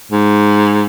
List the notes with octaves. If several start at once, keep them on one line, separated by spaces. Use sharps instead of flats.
G#2